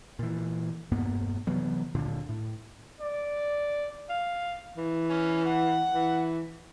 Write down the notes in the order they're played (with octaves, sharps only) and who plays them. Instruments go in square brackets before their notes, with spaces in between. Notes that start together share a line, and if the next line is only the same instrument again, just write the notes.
[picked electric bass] A#2 E3
E1 G2 A#3 B3
C3 E3 F#3 B3
D1 A#2 D3
A2
[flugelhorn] D5
[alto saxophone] F5
E3
[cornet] C#4
F#5
[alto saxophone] E3